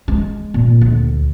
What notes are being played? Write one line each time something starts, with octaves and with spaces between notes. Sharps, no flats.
G#3
A#2
D2